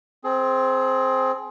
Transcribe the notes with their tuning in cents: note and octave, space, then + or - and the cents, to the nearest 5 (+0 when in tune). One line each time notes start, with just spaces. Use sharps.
C4 +5 G#4 +30